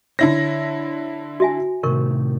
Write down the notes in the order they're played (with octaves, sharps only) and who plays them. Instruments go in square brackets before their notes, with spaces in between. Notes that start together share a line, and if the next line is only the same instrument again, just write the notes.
[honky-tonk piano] D3 E4 A#6 [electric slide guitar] C#5
[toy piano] F#4 E5 G#5
[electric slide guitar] A2 C3 D#3 [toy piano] A#4 C#6